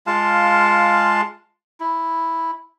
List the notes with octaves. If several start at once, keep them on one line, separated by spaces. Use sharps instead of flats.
G#3 F4 F5 A5
E4